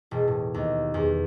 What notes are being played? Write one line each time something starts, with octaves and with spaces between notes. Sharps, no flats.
E1
A2
D#2
E2